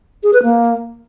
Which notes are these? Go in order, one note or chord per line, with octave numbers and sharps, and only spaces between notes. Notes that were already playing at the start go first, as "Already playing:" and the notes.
G#4
B4
A#3